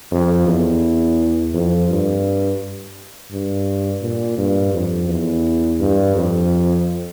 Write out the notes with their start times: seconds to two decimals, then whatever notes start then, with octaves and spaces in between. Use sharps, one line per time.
0.11 F2
0.47 E2
1.53 F2
1.90 G2
3.31 G2
4.02 A#2
4.38 G2
4.74 F2
5.09 E2
5.81 G2
6.15 F2